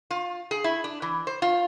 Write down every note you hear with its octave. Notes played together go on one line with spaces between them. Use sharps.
F4
G#4
E4
D4
E3
C5
F4